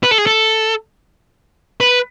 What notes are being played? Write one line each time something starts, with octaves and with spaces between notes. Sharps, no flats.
B4
A4
G#4
A4
B4